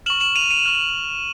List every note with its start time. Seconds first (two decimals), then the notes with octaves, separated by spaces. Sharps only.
0.06 C#6 F6 E7 F#7
0.20 E7 F#7
0.36 D#7 F7
0.51 D#7 F7
0.66 C#6 F6